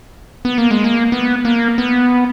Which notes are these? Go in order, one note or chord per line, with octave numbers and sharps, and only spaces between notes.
B3
A#3
G#3
A#3
B3
A#3
B3